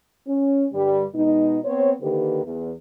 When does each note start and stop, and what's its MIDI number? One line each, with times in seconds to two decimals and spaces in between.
0.27 0.65 61
0.73 1.03 43
0.73 1.03 50
0.73 1.03 55
1.15 1.58 47
1.15 1.58 56
1.15 1.58 63
1.64 1.93 59
1.64 1.93 60
1.64 1.93 72
1.64 1.93 73
2.01 2.43 50
2.01 2.43 51
2.01 2.43 58
2.01 2.43 67
2.01 2.43 71
2.45 2.71 40